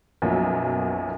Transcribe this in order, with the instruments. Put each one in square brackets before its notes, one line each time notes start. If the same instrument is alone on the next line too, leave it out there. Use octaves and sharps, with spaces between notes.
[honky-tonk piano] B1 F#2 B2 F3 F#3 A#3